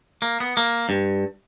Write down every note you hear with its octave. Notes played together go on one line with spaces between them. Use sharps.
A#3
B3
A#3
G2